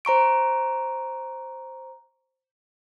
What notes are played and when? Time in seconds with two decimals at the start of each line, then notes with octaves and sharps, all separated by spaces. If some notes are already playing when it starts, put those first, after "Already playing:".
0.05 C5 A#5 C#6 D7